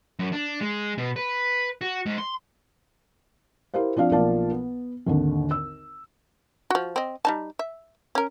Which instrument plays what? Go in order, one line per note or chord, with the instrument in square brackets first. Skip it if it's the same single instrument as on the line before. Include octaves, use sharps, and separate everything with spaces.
[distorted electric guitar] F#2
D4
G#3
B2
B4
F#4
G#2
C6
[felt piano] E4 G4 A#4 C5 F5
F3 C4 D4 F5
B1 F3 A#3 D5 F5 A5
B3
G#1 D#2 D3
E6
[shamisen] F3 F#4
C4 D#5
G3 D#4 A5
E5
C#4 A#4